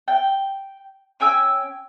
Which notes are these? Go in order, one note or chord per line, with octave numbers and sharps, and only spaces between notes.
G5
C#4 G5 G#5 E6